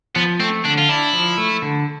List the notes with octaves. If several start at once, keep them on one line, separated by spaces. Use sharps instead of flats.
F3 B3
A3 C4
D3 D4
F4
D4 E4
F3
A3
D3